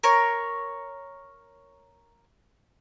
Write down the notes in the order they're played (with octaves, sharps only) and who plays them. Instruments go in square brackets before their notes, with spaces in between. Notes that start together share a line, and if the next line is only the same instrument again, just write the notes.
[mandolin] A#4 C#5